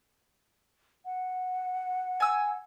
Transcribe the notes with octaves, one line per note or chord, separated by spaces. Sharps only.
F#5
G#5 E6